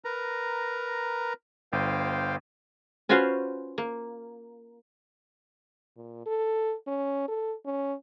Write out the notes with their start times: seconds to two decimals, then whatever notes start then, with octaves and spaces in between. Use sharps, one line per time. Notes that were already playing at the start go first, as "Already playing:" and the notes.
0.05 A#4 B4 A#5
1.73 G1 C5 F5 G5
3.09 C#4 F4 F#4 B4 C5 F5
3.78 A#3
5.96 A#2
6.26 A4
6.87 C#4
7.28 A4
7.65 C#4